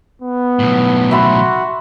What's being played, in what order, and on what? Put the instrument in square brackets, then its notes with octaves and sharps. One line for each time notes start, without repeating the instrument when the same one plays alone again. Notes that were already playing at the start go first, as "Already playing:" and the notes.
[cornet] B3
[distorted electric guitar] B1 A2
[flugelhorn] F#4 [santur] E5 B5 C6